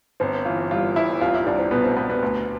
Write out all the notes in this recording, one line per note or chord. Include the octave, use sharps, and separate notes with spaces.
G1 C4
E3 F4
G2 F4
G1 E4
C2 F4
E4
C2 D4
C4
B2 B3
C4
B2 B3
B3
D2